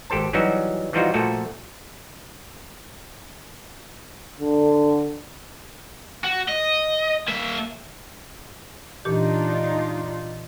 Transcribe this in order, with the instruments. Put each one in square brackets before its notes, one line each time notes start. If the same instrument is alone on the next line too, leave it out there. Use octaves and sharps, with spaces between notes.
[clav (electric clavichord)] G#1 G4 A4 C5 A5
E3 F#3 G3 C#4 D#4 F#4
E3 F3 G3 D#4 F4 F#4
A#2 F3 A3 F#4 A4
[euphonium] D3
[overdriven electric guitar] F#4
D#5
A#3 E5
[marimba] A#2 E3 G4 [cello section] D4 D#4 F4